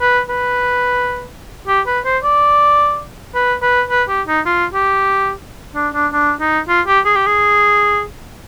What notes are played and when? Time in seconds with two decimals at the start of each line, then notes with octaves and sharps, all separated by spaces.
0.01 B4
0.29 B4
1.68 G4
1.87 B4
2.05 C5
2.23 D5
3.34 B4
3.62 B4
3.90 B4
4.08 G4
4.27 D#4
4.46 F4
4.73 G4
5.75 D4
5.94 D4
6.13 D4
6.40 D#4
6.68 F4
6.87 G4
7.05 G#4
7.15 G4
7.26 G#4